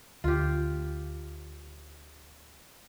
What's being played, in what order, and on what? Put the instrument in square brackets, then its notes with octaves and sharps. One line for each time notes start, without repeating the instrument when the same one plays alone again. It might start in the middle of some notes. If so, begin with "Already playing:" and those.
[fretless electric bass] D2 [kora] F4 G4